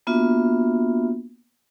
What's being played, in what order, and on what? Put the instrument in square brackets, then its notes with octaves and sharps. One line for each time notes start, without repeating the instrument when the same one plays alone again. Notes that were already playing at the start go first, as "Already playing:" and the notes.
[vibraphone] A#3 B3 D4 F4 F#4 E5